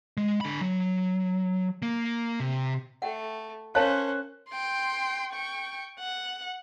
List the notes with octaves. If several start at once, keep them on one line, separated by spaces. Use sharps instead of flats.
G#3
D3 B5
F#3
A#3
C3
A3 F#5 G5
C#4 A#4 C5 C#5 F5 A5 F#6
G5 C6
G5 C#6
F#5